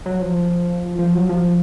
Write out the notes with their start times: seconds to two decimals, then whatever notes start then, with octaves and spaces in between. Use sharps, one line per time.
0.06 F#3
0.21 F3
0.99 F3
1.14 F#3
1.29 F3